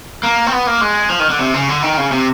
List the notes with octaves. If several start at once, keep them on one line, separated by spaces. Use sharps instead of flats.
A#3
C4
B3
A#3
G#3
F3
D#3
D3
C3
C#3
D3
D#3
C#3
C3